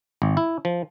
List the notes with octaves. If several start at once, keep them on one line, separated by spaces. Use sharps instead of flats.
G#1
E4
F3